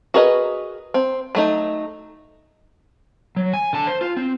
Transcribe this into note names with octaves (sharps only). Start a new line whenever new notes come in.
F#4 G#4 A#4 B4 D#5
C4
F#3 A3 D#4
F#3
G#5
D3 A5
C5
F4
C4